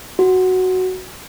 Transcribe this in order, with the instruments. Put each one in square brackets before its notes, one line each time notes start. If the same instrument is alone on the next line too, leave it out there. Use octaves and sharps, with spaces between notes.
[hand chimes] F#4